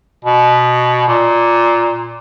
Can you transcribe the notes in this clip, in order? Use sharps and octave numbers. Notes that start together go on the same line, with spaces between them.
B2
A#2